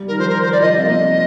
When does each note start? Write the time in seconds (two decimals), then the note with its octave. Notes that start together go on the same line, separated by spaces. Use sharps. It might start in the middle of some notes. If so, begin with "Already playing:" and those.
Already playing: G3
0.08 D#3 A#4
0.18 F3 C5
0.29 A#4
0.42 C5
0.52 G3 D5
0.61 F3 D#5
0.75 C4 F5
0.81 D#5
0.86 A#3